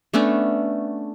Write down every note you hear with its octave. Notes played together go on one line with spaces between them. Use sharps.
A3 B3 C#4 D4